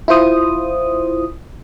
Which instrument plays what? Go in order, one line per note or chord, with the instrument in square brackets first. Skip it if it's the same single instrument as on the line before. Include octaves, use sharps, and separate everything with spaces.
[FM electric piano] E4 F4 C5 D#6